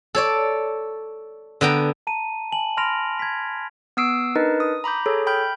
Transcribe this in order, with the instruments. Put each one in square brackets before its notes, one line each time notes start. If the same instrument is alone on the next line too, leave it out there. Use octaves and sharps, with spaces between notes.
[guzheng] A4 C#5 D5
D3 B3 G5 A#5
[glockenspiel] A5 A#5 D#7
G#5 A5 F#7
B5 C6 F6 A#6 D7 F7
G#6 B6
[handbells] B3 D#6 E6 C7 D7
D4 D#4 A#4 B4 D#5
D#6
A#5 B5 D6 G6
G#4 A4 C#5
G5 B5 F6 G6